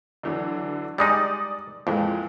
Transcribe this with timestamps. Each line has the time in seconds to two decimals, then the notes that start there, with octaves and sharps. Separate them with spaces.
0.23 D3 E3 F#3
0.98 G3 G#3 D#4 D5 D#6
1.87 F2 A#2 E3 G#3